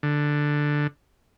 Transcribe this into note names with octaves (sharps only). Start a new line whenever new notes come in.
D3